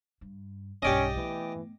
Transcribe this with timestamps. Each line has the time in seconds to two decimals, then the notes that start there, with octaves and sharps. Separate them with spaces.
0.21 G2
0.82 B1 G2 C#4 G4 D5 D#5
1.16 E3 A3 B3